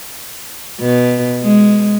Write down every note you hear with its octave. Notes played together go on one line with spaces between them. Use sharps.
B2
G#3